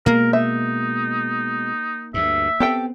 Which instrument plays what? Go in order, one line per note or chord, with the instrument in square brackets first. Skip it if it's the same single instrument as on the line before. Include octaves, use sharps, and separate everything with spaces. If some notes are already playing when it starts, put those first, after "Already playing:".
[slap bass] B2 G#3 [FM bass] A#3 [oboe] A#4
[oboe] D#4 [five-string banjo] E5
[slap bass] D2 G2 [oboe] E5
[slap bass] B3 C4 [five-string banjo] G4 A4 G5